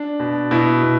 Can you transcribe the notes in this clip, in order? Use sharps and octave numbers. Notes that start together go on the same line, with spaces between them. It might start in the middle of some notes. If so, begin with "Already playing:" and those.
Already playing: D4
B2
B2 E4
B2